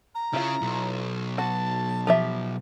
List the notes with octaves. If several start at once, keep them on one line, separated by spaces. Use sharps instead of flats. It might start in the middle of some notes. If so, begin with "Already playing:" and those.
A#5
C#3 E4 F4
B1
F#4 F#5 A5
F3 G4 E5